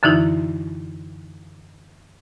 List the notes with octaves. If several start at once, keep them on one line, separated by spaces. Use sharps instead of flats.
F#2 D3 E3 D#4 E4